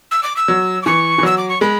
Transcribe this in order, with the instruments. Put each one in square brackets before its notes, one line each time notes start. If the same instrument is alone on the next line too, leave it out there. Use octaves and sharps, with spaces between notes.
[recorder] E6
D6
E6
[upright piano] F#3
[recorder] D6
[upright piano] E3 [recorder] C#6
[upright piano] E3
[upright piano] F#3 [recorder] E6
[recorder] D6
C#6
[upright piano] G#3 [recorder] B5